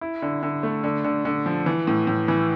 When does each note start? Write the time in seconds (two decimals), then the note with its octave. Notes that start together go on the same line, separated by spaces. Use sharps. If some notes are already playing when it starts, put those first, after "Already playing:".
0.01 E4
0.22 D3
0.43 D3
0.63 A3
0.84 D3
1.04 D3
1.25 D3
1.46 F3
1.66 E3
1.87 A2
2.07 A2
2.28 E3